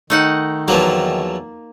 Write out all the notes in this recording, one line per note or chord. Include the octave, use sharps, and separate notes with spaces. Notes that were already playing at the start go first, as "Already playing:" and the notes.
D#3 A3 D#4 F#5
E2 F3 F#3 A#3